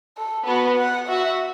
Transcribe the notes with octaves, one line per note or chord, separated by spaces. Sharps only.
A4
B3 F#4
F#5
F#4 E5